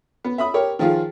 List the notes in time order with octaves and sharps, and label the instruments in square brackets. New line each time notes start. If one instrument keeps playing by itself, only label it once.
[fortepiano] B3
E5 B5 D#6
G4 A#4 C#5
D#3 F3 F4 G#4